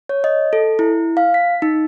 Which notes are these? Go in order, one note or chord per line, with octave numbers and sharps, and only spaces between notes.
C#5
D#5
A4
E4
F5
B6
D#4